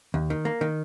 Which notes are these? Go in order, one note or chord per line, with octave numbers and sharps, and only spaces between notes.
D#2
D#3
A#3
D#3